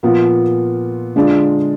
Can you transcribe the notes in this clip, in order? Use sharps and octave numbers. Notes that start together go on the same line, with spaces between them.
A#2 F3 B3 F4
D3 G#3 D4 F4